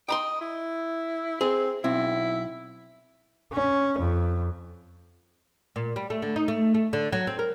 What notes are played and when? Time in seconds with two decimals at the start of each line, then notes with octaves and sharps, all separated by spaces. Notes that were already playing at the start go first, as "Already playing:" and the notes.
0.09 D#5 G5 B5 C6
0.41 E4
1.41 C4 G#4
1.84 B1 C4 E4
3.53 C#4
3.99 F2
5.76 A#2
5.96 G3
6.10 A3
6.22 D3
6.36 D#4
6.48 A3
6.74 A3
6.93 D3
7.12 F#3
7.27 C4
7.39 A#4